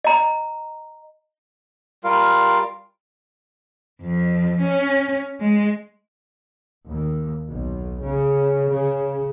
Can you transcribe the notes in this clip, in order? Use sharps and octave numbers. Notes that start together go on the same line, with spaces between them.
D#5 A#5
G3 F4 A#4 F5
F2
C#4
G#3
D#2
B1
C#3
C#3